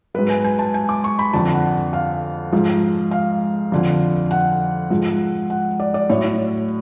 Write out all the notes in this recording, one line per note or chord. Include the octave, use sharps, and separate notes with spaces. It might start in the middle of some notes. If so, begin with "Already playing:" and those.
G#2 F#3 B4
G#5
G#5
A5
G#5
D6
C#6
B5
F2 D3 F3 A5
F#5
F5
G#2 F3
F5
F2 D3 F3
F#5
G#2 F3
F#5
D5
D5
A2 F#3 C#5